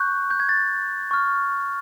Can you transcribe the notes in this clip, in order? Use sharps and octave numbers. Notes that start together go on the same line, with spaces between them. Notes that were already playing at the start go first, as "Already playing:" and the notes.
Already playing: C#6 F#6 G6
G6
G#6
A6
C#6 F6